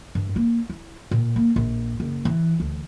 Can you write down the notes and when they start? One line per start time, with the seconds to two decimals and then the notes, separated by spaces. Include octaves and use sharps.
0.15 G2
0.36 A#3
0.70 E4
1.11 A#2
1.36 A#3
1.56 A#1
2.00 F#1
2.25 E3
2.60 D2